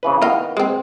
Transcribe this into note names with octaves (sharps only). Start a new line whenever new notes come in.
C#3 E3 B4
D#3 B3 E4 D#5 F5
G#3 C4